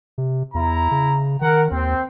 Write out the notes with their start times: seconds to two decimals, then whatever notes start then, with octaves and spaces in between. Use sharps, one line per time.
0.18 C3
0.54 E2 E4 A#5
0.91 C#3
1.41 D#3 A#4 F#5
1.71 D#2 C4